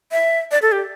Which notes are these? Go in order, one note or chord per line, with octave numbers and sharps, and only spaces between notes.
E5
D5
A4
G4